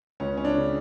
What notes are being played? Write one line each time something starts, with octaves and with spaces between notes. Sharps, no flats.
C#2 C#4
C#4
D4
C#3